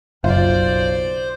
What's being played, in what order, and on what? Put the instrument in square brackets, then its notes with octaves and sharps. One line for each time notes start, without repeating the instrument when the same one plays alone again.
[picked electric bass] F#1 [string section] B1 D5 [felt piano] F4 [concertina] C5